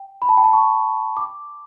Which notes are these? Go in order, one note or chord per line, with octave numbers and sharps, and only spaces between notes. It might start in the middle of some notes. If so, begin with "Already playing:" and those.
Already playing: G5
B5
A5
G5
A5
C#6
D6